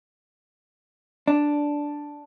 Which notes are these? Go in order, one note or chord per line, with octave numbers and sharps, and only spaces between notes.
D4